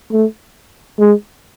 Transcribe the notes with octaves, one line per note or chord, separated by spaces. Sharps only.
A3
G#3